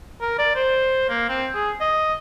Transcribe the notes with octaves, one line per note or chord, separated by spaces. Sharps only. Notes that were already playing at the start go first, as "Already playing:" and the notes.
A#4
D5
C5
A#3
C4
G#4
D#5